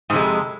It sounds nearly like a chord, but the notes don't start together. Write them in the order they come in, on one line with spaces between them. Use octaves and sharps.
G#2 C3 G#3 F2